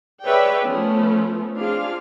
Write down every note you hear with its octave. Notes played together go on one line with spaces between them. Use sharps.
G#4 B4 C#5 D5 E5 G5
F3 A3 B3 C#4
C4 D4 F4 G#4 F5